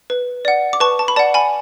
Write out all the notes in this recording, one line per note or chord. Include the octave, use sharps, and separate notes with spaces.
B4
D5 F#5
D6
B4 A5 C#6
A5
B5
D5 F#5 A5
G#5 B5